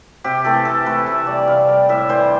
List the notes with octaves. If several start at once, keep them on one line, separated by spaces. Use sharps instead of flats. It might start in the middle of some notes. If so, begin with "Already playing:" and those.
C3 G4
E3 A3 A4
C3 A4
E3 A3 B4
C3 E5
G3 D5
C3 F5
G3
A2 E5
E3 G3 C5